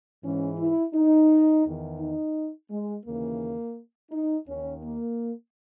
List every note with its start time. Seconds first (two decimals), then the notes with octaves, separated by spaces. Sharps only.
0.23 G#2 E3 C#4
0.59 E4
0.94 D#4
1.65 E2 D#3
2.00 D#4
2.70 G#3
3.05 D#2 C#3 E3 A#3
4.11 D#4
4.47 D#2 D#3 C#4
4.82 A#3